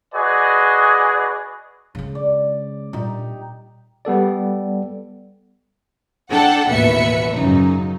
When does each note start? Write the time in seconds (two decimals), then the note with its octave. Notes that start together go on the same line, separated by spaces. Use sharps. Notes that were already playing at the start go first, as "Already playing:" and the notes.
0.14 F#4 G#4 B4 D5 D#5 G#5
1.95 C#3 G#3
2.15 D5
2.93 A#2 G3 D#4 G4
4.05 G3 B3 A4 D5
6.30 D4 A4 F#5 G5 A5
6.68 A1 D#2 B2 B4 E5 C#7
7.33 F#2 C#3 D#4